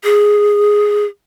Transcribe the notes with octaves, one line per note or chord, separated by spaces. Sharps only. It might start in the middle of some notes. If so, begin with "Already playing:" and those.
G#4